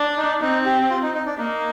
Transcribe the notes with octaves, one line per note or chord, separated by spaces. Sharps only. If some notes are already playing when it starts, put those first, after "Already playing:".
Already playing: D4
D#4
C4 D#4
G4
G4
F4
D#4
D#4
D4
A#3 D#4